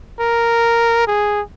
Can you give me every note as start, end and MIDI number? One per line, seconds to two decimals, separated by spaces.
0.20 1.06 70
1.07 1.41 68